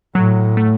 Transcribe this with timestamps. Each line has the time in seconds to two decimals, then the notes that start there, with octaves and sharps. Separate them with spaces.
0.15 A2 F#3
0.57 A3